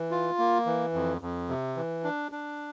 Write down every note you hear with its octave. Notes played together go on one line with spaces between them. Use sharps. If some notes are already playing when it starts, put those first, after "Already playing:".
Already playing: E3
F4
A#3
E3
F2
F2
C3
E3
D4
D4